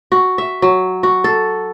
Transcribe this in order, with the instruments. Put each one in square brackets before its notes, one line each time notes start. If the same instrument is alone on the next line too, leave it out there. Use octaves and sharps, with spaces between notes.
[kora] F#4
E5
F#3
F#4
A4